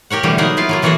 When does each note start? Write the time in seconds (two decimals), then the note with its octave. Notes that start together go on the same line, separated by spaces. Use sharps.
0.10 G4 A#4 C#5 F#5
0.23 B2 D3 E3 G3 A3 A#3
0.38 F#3 A#3 B3 D#4 G#4 A#4
0.57 E4 F4 F5
0.69 F#3 A#3 F4
0.82 B2 E3 A#3 F#4 G#4 A4